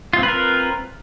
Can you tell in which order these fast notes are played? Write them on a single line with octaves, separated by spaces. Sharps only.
F4 C4 B4 A#4